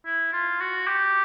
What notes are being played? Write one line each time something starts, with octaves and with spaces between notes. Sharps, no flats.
E4
F4
F#4
G4